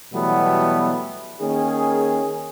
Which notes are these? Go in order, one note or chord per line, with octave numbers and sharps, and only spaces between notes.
B2 E3 F#3 G3 A3 B3
D#3 A#3 C#4 G#4